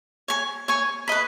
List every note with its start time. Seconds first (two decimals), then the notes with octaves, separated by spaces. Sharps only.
0.28 C#5 G#5 C#6
0.68 C#5 G#5 C#6
1.08 B4 D#5 B5